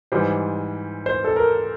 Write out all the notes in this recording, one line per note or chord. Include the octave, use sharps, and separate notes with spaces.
G#2 E3 G3 C5
C5
A4
A#4